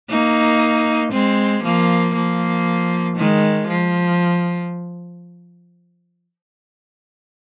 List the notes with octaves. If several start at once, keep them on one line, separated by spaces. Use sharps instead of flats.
A#3 D#4
G#3 C4
F3 A#3
F3 A#3
D#3 G#3
F3